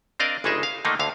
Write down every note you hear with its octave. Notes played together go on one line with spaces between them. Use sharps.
C4 D4 A#4 D5 D#5 F5
G1 C#3 G#3 D#4 G#4 E5
F5
D3 D#3 A3 A#3 D4 D#4
D2 D3 F5